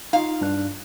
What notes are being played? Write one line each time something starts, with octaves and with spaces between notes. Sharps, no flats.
D#4 F4 F5
G2 D4 F#6